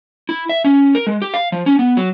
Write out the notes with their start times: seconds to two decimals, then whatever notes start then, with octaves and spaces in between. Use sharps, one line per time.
0.29 E4
0.49 E5
0.64 C#4
0.95 A#4
1.07 G#3
1.22 G4
1.34 F5
1.52 F3
1.66 C#4
1.79 B3
1.97 F#3